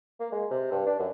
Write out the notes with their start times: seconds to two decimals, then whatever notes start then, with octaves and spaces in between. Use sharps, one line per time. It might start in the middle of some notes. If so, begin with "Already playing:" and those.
0.20 A#3
0.32 G#3
0.51 C3
0.72 G2
0.86 D4
0.99 F#2